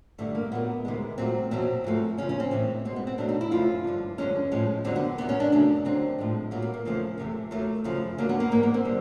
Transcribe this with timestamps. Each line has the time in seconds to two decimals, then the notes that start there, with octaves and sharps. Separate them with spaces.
0.18 G2 D3 G3 A3
0.35 A#3
0.52 A#2 F#3 A3 B3
0.85 D2 C3 D#3 G#3
1.18 A#2 F#3 A3 C4
1.51 E2 B2 F#3 C4
1.84 G#2 F3 A3
2.18 D#2 C#3 F3 C#4
2.29 C#4
2.40 C4
2.51 A2 E3 G#3
2.85 B2 G#3 C4
2.96 B3
3.07 C4
3.18 B2 F#3 A3 D4
3.29 D#4
3.41 E4
3.51 F#2 C#3 F3 A3 F4
3.84 G2 D3 F3
4.18 G2 D3 F3 G#3 C#4
4.51 A2 F3 G#3
4.85 F2 D3 F#3 C4
4.96 B3
5.18 D2 C3 D#3 B3
5.29 C#4
5.40 D4
5.51 F#2 C#3 F#3 A3
5.85 D#2 D3 F#3 A3 C4
6.18 A2 F3 G#3
6.51 A#2 F#3 A3 B3
6.62 A#3
6.74 A#3
6.85 E2 C#3 F3 A3
7.18 E2 C3 F3 A3
7.51 D#2 D#3 F#3 A3
7.84 F#2 C#3 F3 A3
8.18 F#2 D3 F#3 A3 A#3
8.29 B3
8.40 A#3
8.51 G#2 E3 G3 A#3
8.63 B3
8.74 C4
8.85 D3 G3